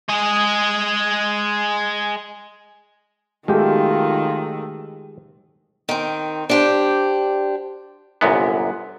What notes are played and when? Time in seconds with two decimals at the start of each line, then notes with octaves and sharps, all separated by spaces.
0.09 G#3 G#4
3.48 B1 D#3 G#3 A3 F4 G4
5.89 D#3 C4
6.50 D4 G4 C5
8.21 G1 C2 F#2 A#2 B3